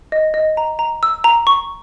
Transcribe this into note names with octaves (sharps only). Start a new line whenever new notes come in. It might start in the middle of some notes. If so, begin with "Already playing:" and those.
D#5
D#5
A#5
A#5
E6
A#5
C#6